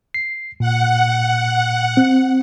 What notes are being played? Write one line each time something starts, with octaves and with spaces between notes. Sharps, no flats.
C7
A#2 F#5
C4